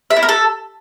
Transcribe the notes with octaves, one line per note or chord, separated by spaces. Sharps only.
E5
E4
A#4
A4